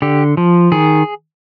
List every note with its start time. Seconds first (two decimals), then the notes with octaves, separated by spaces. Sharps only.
0.02 D3 G4
0.37 F3
0.72 D#3 G#4